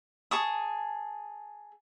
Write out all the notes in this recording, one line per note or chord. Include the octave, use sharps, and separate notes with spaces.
G#4 A5 C#6 D#6